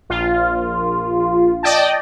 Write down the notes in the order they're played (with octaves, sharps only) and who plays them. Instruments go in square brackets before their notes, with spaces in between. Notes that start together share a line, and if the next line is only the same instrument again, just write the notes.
[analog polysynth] A#1 F4
D5 D#5 G5 A5